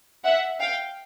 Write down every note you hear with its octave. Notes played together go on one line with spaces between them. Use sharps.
E5 F#5
F5 G5